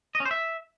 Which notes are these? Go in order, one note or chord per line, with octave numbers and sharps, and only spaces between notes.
D#5
C#4
C5
E5